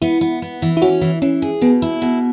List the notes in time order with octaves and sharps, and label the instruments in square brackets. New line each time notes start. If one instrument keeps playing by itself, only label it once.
[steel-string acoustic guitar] B3 [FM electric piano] E4
[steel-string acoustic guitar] B3
B3
E3
[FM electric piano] E4
[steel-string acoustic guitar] C#4 [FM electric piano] F#4
[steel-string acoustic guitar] E3
[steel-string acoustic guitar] E3 [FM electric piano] C#4
[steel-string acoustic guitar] G#4
[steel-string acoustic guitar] B2 [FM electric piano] B3
[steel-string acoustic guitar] E4
B2